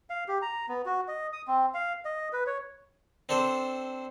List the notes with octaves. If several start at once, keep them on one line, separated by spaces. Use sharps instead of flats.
F5
G4
A#5
B3
F#4
D#5
D#6
C4
F5
D#5
B4
C#5
C4 D4 A4 C5